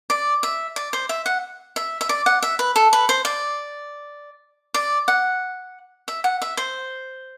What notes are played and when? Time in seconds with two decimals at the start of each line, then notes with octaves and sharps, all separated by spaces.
0.10 D5
0.43 E5
0.76 D5
0.93 C5
1.09 E5
1.26 F#5
1.76 E5
2.01 E5
2.09 D5
2.26 F#5
2.43 E5
2.59 B4
2.76 A4
2.93 B4
3.09 C5
3.25 D5
4.74 D5
5.08 F#5
6.08 E5
6.24 F#5
6.42 E5
6.57 C5